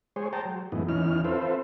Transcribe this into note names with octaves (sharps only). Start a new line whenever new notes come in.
G#3 G#4 C5 C#5
G#4 C5 G5 A5 A#5
F#3
F#2 A2 E3 G#3 B3 D#4
E2 E3 C#4 D#4 F6
C4 F4 A4 B4 C5 E5